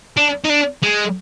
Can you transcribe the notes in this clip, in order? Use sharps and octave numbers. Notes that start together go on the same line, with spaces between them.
D4
D#4
D4
G#3